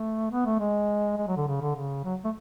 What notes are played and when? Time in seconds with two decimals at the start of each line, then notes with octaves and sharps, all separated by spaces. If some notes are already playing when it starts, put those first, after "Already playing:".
Already playing: A3
0.31 B3
0.45 A3
0.59 G#3
1.17 G#3
1.27 F#3
1.36 D3
1.47 C#3
1.61 D3
1.76 C#3
2.04 F#3
2.24 A3